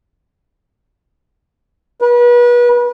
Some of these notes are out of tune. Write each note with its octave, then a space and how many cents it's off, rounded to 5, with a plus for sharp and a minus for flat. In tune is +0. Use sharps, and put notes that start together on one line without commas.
B4 -35